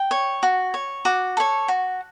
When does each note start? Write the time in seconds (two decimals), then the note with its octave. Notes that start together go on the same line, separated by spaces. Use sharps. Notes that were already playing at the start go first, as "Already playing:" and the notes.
Already playing: G5
0.11 C#5
0.43 F#4
0.74 C#5
1.05 F#4 D6
1.37 A4 C#5
1.68 F#4